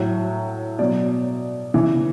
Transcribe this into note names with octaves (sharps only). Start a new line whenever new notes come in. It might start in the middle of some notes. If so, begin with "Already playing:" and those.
Already playing: A2 F#3
B2 F#3 D5
C#3 E3